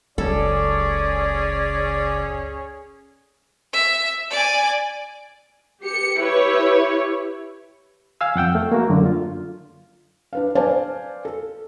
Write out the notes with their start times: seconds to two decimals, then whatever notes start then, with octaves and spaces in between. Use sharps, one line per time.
0.18 F#1 C#2 C#4 G#4 A4 D5
3.74 E5
4.31 D5 G#5
5.82 G4 C#7
6.17 E4 G4 B4 C#5
8.21 F5 G#5 E6
8.35 F2 F#5 G5 E6
8.55 A3
8.72 A#3 F#4
8.90 F#2 D3
9.06 F4
10.33 D4 B4 F5
10.55 B4 C5 D5 F5 G#5 A5
11.25 A4